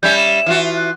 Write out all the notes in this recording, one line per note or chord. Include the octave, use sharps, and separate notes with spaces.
G3 C#4 E5 G6
E7
E3 F4 F#4
F#6